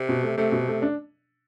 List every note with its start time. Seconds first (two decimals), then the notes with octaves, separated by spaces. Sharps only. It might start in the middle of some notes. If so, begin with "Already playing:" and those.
Already playing: C3
0.09 B2
0.23 A3
0.37 C3 A3
0.52 B2
0.68 A3
0.82 D4